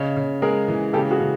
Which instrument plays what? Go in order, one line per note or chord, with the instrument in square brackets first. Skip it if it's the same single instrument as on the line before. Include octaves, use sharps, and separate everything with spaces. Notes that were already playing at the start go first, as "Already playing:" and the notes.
Already playing: [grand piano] C#3 [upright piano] C#5 D#5
[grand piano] C#3
[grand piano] G#3 [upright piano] G#4 A#4
[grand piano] E3
[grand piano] C#3 [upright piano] G4 A4
[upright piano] F#4 G#4
[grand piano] C#3